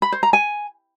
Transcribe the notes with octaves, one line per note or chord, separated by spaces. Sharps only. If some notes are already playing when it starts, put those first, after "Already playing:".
B5
C5
A#5
G#5